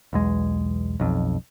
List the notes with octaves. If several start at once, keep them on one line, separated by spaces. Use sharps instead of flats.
B1 E2 G#3
B1 F2